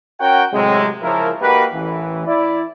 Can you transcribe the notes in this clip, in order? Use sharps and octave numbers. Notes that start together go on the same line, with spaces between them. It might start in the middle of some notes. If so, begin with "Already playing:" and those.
C#4 F#4 A#4 F#5 G5
A2 C3 F#3 G#3
C#3 F3 E4 A#4
A#3 D#4 F#4 G4 A#4 B4
A1 E3
E4 D5